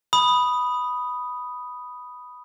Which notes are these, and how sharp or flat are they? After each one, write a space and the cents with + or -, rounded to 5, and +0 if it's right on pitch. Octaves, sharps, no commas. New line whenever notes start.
B5 +0 D#6 +0